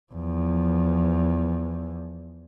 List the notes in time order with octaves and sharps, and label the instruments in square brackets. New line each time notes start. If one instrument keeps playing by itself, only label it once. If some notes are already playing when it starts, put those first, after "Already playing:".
[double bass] E2 F3